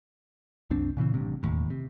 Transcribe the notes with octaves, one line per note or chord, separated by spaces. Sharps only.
C2 F#2 C4 D4
A#2 C#3 E3 C4
A1 G2 C3
E1 D#2 A2
C3